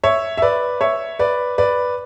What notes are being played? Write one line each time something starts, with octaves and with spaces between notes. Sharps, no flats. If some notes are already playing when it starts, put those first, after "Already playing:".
C#5 E5
E5
B4 D5
C#5 E5
B4 D5
B4 D5